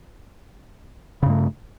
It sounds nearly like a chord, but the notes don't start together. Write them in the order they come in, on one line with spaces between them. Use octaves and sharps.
C#3 G2 A3